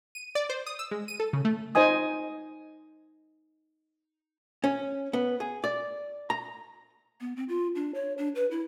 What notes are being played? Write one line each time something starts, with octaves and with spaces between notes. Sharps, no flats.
D#7
D5
C5
D#6
E6
G#3
D#7
A4
C#3
A3
D#4 C5 D#5 G#5 D#6
C#4
B3
G#4
D5
A#5
B3
C4
F4
D4
C#5
D4
B4
E4